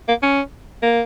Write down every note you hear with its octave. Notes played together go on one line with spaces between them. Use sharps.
A#3
C#4
A#3